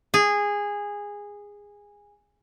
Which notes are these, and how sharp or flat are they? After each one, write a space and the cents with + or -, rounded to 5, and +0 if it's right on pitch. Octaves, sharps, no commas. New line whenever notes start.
G#4 -15